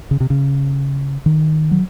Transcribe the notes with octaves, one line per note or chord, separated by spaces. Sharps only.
C#3
C3
C#3
D#3
F#3